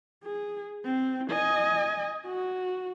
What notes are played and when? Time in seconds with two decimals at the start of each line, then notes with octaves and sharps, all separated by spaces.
0.24 G#4
0.85 C4
1.31 D#5 G#5
2.26 F#4